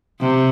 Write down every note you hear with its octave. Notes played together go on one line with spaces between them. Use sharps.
C3